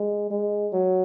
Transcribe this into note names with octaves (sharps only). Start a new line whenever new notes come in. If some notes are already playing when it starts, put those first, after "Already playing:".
Already playing: G#3
G#3
F#3